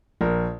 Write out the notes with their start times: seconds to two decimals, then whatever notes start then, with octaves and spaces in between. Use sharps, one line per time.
0.21 A#1 A#4